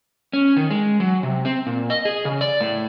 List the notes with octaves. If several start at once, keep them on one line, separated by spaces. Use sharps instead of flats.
C#4
D#3
G#3
F#3
C3
C4
A#2
D#5
G#4
C#3
D5
A2